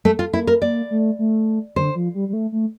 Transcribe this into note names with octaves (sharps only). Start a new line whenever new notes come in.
A3
F4
A#3 E4
A#4
A#3 D5
A3
A3
D3 C5
F3
G3
G3
A3
A3